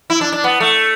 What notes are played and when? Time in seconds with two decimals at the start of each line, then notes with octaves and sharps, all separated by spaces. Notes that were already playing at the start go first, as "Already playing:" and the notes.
0.10 E4
0.21 D4
0.32 D4
0.44 B3
0.60 A3